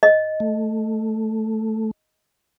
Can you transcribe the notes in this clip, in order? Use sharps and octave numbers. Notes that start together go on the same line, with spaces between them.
D#5
A3